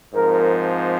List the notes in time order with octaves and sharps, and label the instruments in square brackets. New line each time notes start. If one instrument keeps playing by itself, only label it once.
[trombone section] G#2 F3 C4 A#4